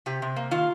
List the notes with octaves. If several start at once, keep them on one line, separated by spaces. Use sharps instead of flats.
C3 G4
C3
A#3
D#3 F4